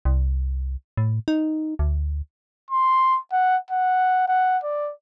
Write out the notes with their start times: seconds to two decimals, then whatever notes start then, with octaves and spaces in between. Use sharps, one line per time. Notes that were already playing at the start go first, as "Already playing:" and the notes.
0.05 C2
0.97 A2
1.28 D#4
1.79 D2
2.71 C6
3.32 F#5
3.71 F#5
4.28 F#5
4.63 D5